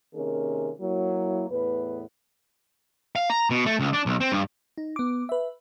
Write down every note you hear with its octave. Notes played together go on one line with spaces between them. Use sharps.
C3 D#3 A#3 C#4 G#4 A#4
F#3 A#3 E4
E2 A2 B3 B4
F5
A#5
B2
A3
C#2
D4
B1
C4
G2
D#4
B3 D6
B4 E5